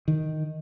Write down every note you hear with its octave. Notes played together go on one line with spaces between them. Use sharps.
D#3